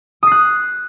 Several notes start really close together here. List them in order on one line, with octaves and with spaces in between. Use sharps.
D#6 C7 F#6